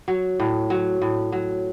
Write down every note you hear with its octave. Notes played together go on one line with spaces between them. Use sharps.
F#3
A2
F#3
A2
F#3